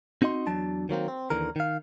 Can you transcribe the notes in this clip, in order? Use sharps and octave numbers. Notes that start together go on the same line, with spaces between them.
C4 D#4 F#4 D#5 C6
E2 F#3 D4 A5
D#3 F#3 A#3 C4
C4
D#2 D3 E3 A#4
D#3 F5